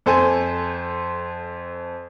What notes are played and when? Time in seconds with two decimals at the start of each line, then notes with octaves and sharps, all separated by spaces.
0.06 F2 A4 C5 G#5